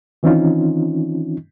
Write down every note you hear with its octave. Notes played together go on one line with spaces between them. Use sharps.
D#3 E3 C4 C#4 D#4 F4